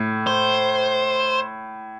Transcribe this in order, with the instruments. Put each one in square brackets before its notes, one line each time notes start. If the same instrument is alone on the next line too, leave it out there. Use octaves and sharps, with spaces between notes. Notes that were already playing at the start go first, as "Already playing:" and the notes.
Already playing: [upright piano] A2
[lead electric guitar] C5